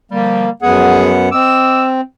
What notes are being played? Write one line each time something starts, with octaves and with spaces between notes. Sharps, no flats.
D3 F3 G3 A#3
F#2 F3 G#3 B3 G#4 F#5
C4 D#5 D6 E6